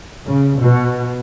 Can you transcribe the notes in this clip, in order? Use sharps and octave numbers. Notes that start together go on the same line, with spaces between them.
C#3
B2